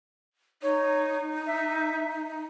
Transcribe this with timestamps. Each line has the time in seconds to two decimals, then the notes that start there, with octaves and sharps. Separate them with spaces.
0.63 D#4 C#5
1.47 E5